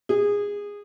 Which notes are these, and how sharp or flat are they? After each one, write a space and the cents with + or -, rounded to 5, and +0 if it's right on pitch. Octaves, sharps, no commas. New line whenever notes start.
G#4 -20